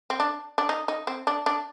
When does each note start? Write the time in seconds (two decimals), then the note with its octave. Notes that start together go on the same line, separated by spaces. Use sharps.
0.10 C4
0.20 D4
0.58 D4
0.69 D#4
0.88 D#4
1.07 C4
1.27 D4
1.46 D4